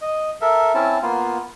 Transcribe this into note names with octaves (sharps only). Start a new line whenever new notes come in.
D#5
A4 A#4 E5
C4 C#4 E4 A5
A#3 B3 F4